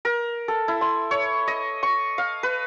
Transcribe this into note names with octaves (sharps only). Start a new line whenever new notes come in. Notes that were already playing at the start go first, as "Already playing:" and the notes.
A#4
A4
E4
C6
C#5
D#5
C#6
F5
B4